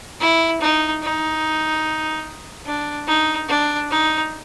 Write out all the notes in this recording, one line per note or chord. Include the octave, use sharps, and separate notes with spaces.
E4
D#4
D#4
D4
D#4
D4
D#4